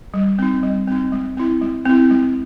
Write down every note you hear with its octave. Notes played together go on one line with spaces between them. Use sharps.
G3
C4 D#4
G3
C4 D#4
G#3
C4 E4
G#3
C4 E4
G#3